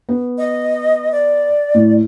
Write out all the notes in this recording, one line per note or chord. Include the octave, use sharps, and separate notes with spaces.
B3
D#5
D5
A2